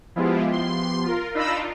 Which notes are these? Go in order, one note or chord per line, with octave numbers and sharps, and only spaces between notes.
F3 G#3 B3 E4 F4 G4
C6
F4 A#4
D4 D#4 F4 B5 E6 A#6